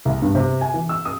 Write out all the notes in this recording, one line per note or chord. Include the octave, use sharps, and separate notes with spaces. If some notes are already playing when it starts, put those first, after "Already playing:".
C2
G2
C3
G#5
E3
E6
D#6